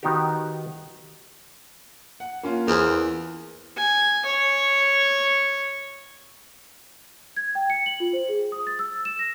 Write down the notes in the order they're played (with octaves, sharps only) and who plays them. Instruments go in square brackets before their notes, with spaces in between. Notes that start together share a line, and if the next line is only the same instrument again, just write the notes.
[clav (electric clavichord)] D#3 B3 D#4 F#4 G4
[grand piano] F#5
A#3 C#4 F4
[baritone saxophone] E2 [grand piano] A#4 C5 G#5
[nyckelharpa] G#5
C#5
[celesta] G#6
G5
C#7
F#7
F4
C5
G#4
D#6
A6
E6
E7
A#6